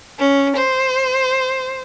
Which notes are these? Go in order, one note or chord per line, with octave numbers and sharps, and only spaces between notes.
C#4
C5